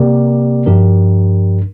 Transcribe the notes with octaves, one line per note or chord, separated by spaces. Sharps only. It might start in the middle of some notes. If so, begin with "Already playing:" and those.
Already playing: C3 A#3 G4 A#4 D5
G2 F3 D4 G4 A#4